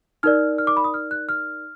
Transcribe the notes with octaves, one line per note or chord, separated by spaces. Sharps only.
D#4 A#4 D5 F6
F6
D6
B5
D#6
F6
F#6
F6